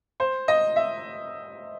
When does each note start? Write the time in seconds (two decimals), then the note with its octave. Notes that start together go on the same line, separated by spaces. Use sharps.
0.20 C5
0.48 D#5
0.76 E5